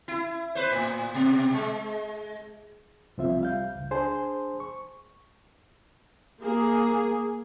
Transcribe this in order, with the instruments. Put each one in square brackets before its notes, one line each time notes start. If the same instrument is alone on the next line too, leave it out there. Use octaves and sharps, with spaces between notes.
[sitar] E4
B4 C5
A2
B2
G#3
[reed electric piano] C2 F3 C4 F4 E5
G3 F5 G6
C#2
D4 G#4 C5 G#5 A5 C6
C#6
[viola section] A#3 G#4